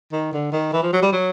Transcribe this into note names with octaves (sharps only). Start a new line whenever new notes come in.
D#3
D3
D#3
E3
F3
F#3
G3
F#3